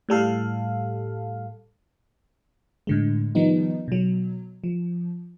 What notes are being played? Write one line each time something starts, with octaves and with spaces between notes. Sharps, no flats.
A2 G3 A4 F5
A2 D3 G#3
D#3 F3 G3 B3 D#4
B2 F#3
F3